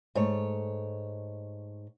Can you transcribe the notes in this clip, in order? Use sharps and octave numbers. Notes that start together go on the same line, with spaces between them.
G#2 A3 C#5